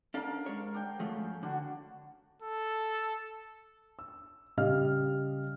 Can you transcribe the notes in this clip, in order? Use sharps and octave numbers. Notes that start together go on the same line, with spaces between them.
C#4 D4 A4 A#4 F5
G#3 C#5
D4 G5
G#2 F3 A3 C#4
D3 D4 F#4
A4
E6
C#3 G3 D#5 F5 F6